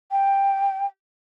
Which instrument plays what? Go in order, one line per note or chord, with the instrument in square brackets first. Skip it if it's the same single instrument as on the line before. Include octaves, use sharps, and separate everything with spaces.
[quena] G5